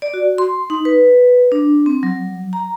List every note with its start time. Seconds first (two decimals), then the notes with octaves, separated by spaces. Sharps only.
0.02 D5
0.14 F#4
0.38 C6
0.70 D#4
0.85 B4
1.52 D4
1.86 C4
2.03 F#3
2.53 A#5